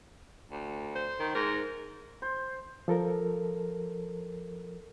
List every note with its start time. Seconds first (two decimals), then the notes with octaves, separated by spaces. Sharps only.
0.51 D2
0.95 C5
1.20 D#3
1.35 G#2 A#4
2.22 C5
2.88 F3 A4 A#4